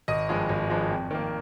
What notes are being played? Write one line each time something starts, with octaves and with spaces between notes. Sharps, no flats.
G#1 D#5
G2 F3 G#3
G#1
G2 F3 G#3
F2
D#3 A#3